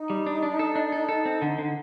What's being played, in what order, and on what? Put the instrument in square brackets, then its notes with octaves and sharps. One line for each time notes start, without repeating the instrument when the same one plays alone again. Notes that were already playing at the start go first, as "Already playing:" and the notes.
Already playing: [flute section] D#4
[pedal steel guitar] G3
D4
D4
A4
D4
A4
A4
C4
D3
D3